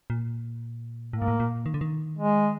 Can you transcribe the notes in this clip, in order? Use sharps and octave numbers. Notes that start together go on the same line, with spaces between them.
A#2
A2 A#3
G#2
A2
A#2
D#3
D3
D#3
G#3